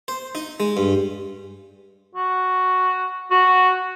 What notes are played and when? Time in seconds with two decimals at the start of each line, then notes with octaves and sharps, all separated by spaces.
0.08 C5
0.35 D#4
0.60 G#3
0.77 G2
2.15 F#4
3.31 F#4